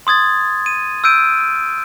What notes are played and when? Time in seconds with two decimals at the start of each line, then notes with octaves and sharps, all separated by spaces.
0.07 C6 D#6 G#6 A6
0.66 D#7
1.04 E6 F6 G6 D7 D#7